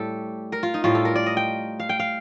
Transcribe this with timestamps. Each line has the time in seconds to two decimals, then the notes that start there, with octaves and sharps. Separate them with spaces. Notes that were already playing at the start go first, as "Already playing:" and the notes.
Already playing: A2 G3 G4 A4
0.52 A#4
0.63 F4
0.74 D#4
0.84 A2 G3 F4
0.95 A4
1.05 A#4
1.16 D5
1.26 D#5
1.37 G5
1.80 F5
1.89 G5
1.99 F5